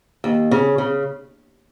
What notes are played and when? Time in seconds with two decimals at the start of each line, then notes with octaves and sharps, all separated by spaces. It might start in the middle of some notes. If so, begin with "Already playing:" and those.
0.24 D#2
0.51 C#3
0.78 C#3